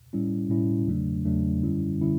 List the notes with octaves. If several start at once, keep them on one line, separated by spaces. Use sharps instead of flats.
A2 G3 C#4 E4
A2 G3 C#4 E4
E2 C#3 F#3 A3 D4
E2 C#3 F#3 A3 D4
F#2 D3 G3 C#4 E4
D3 G3 C#4 E4